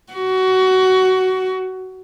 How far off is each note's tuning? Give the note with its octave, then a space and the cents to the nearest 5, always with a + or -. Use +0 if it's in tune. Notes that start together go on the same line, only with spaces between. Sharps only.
F#4 +20